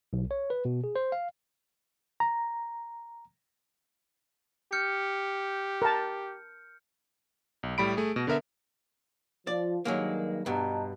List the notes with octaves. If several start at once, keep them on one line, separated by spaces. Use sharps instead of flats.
B1
C#5
B4
B2
G#4
C5
F5
A#5
G4 F6 G6 C#7
A#4 A5
B1
A2 G3 B5 D7
A3 G#4
B2
D3 B3 A#4 E5
F3 D5
G2 D#3 F#3 G#3 A#3
G2 B2 D#5 A5 A#5